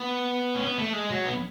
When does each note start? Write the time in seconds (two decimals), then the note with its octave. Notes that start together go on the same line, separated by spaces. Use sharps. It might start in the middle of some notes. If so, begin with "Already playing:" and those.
Already playing: B3
0.55 C#4
0.66 B3
0.78 A3
0.93 G#3
1.10 F#3
1.25 B3